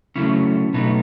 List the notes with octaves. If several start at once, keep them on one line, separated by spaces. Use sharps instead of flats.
C#3 F#3 A3 C#4 E4
B2 F#3 A3 B3 D#4